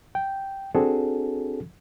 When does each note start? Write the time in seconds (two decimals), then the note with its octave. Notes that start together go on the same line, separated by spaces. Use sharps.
0.15 G5
0.75 C4 D4 F#4 G#4 A4